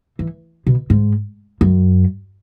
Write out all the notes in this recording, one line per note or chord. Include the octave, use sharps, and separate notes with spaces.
E3
B2
G#2
F#2